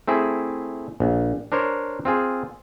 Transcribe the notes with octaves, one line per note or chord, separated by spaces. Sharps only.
A3 C4 E4 G#4
A#1
D4 A#4 C5 C#5
C4 F4 G#4